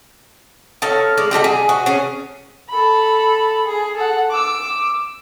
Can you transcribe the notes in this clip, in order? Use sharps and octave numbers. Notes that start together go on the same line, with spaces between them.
D#4 A4 C#5 F5
G#3 D5
G3 F#4 A4 D#5
G#4
F#4
C#4 G#4
A4 B5
G#4
A4 F#5
D6 E6